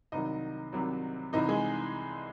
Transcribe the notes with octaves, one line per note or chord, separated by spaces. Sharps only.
C2 C3 D#3 F#3 D#4 D#5
C2 C3 D#3 F#3
C2 C3 E3 D#4 D#5
G#3 G#4